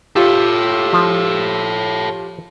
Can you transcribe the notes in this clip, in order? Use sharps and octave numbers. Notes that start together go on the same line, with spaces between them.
F4 G4 A4 C#5 E6
F3